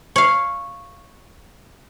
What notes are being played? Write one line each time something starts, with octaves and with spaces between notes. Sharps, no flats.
C#5 F5